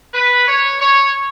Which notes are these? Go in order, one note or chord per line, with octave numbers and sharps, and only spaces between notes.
B4
C#5
C#5